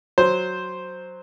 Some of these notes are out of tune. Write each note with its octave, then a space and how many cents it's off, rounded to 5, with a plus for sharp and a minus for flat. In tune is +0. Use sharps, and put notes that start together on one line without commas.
F#3 +0 C5 +0